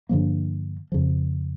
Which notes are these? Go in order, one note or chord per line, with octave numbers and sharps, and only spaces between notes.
G2 D3 F3 A#3
F2 C#3 F3